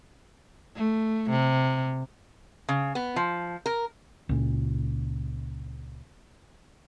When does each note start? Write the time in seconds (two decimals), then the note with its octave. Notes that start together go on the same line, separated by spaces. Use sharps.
0.76 A3
1.30 C3
2.69 C#3
2.95 B3
3.16 F3
3.66 A#4
4.29 C#2 A#2